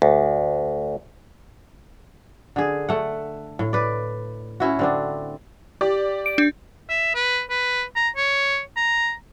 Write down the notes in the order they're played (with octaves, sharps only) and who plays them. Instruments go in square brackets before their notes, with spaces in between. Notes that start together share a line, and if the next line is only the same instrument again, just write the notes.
[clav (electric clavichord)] D2
[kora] D3 G#4
A3 F#5
A2
B4 D5
C#4 E4 F#4
D3 C4 D4
[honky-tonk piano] G4 D5
[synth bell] D7
D4
[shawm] E5
B4
B4
A#5
C#5
A#5